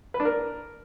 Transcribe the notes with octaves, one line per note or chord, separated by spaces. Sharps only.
B4
D4
A#4